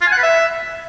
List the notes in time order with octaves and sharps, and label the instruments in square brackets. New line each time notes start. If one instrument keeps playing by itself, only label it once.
[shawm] F4
G#5
F#5
B4
E5